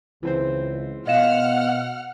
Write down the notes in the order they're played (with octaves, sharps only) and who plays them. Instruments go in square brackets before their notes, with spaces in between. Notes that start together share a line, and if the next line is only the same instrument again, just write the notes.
[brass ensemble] C#2 [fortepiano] E3 C4 C5
[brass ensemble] B2 [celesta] D#5 F5 E7 [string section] F#5 F6